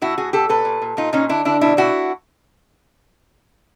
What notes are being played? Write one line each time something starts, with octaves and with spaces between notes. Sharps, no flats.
A2 E4 F#4
A2 F#4 G#4
A#2 G4 A4
A#2 A4 B4
A#2
A#2
A#2 D#4 F4
A#2 C#4 D#4
D3 D4 E4
D3 D4 E4
B2 D4 E4
B2 E4 F#4